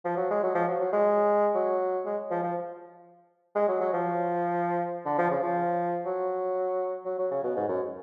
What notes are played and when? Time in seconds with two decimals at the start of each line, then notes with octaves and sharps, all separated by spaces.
0.05 F3
0.17 F#3
0.30 G#3
0.43 F#3
0.55 F3
0.68 F#3
0.80 F#3
0.93 G#3
1.55 F#3
2.05 G#3
2.31 F3
2.43 F3
3.55 G#3
3.68 F#3
3.81 F#3
3.94 F3
5.06 D3
5.18 F3
5.31 C#3
5.43 F3
6.05 F#3
7.05 F#3
7.18 F#3
7.31 C#3
7.44 B2
7.56 G#2
7.68 F#2